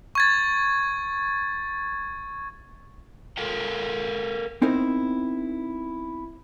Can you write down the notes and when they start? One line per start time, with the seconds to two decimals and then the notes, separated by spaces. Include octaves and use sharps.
0.15 C#6 G#6 A6
3.37 A4 A#4 F5 G5
4.62 B3 C4 D#4 E4 A#4 C5